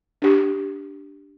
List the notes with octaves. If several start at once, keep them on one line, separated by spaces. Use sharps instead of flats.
D4 G4